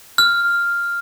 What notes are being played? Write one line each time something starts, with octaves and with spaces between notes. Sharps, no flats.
F6